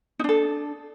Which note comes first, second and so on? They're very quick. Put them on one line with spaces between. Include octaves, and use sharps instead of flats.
D#4 D4 A4